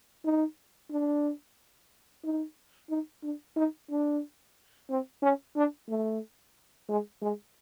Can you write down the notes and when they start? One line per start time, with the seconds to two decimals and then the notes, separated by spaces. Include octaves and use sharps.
0.24 D#4
0.91 D4
2.24 D#4
2.90 D#4
3.23 D4
3.56 D#4
3.90 D4
4.90 C4
5.22 C#4
5.56 D4
5.89 A3
6.89 G#3
7.22 G#3